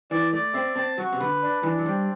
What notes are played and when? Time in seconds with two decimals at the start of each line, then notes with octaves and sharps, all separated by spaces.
0.11 E3 D5
0.32 A3 D5
0.54 C4 E5
0.76 C4 A5
0.98 F#3 F#4
1.13 C3
1.20 D3 B4
1.42 D4
1.63 E3 D4
1.78 F#3
1.86 G3 C4